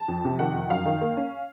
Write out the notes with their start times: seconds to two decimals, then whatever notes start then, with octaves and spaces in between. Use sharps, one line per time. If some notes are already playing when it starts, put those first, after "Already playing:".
Already playing: A5
0.08 F2
0.25 C3
0.39 D#3 F#5
0.54 F2
0.70 F#2 F5
0.86 D#3
1.01 A#3
1.17 C#4